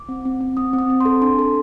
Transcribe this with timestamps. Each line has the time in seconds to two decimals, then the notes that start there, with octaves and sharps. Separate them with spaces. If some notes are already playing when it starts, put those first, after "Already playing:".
Already playing: D6
0.09 C4
0.25 C4
0.41 C4
0.57 C4 D#6
0.73 C4
0.79 D#6
0.90 C4
1.00 A4 C6
1.22 D4 C6
1.39 A4